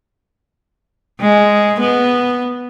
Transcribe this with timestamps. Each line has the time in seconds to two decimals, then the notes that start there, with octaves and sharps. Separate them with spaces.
1.21 G#3
1.81 B3